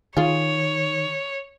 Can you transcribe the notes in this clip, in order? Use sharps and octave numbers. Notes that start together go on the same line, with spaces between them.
D#3 F4 G#4 C#5